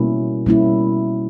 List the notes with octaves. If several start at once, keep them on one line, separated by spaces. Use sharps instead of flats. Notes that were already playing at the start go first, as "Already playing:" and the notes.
Already playing: B2 G3 A#3 C#4 E4
B2 G3 A#3 C#4 E4